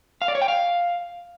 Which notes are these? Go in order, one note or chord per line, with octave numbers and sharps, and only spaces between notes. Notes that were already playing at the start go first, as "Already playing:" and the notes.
F5
D5
C#5
G5
F5